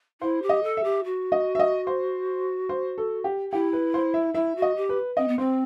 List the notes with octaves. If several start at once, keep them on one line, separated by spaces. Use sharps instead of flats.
E4 C5
G4
D#5
A4
E5
G4
F#4
D#5
E5
D#5
C5
C5
A4
G4
E4 G4
B4
C5
E5
E4 E5
F#4
D#5
G4
B4
C4 D#5
B3
C4 C5